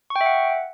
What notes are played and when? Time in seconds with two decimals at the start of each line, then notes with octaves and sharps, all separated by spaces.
0.10 C#6
0.16 G5
0.21 E5
0.26 F#5